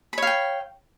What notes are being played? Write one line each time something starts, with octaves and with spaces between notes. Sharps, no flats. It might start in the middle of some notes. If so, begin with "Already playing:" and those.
C#5 F5 G5 B5